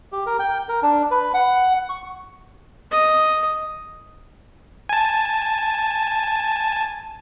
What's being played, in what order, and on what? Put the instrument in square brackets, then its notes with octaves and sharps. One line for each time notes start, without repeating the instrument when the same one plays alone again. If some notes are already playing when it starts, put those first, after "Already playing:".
[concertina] G4
A#4
G5
A#4
D4
B4
F#5
C#6
[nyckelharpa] D#5
[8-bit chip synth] G#5 A5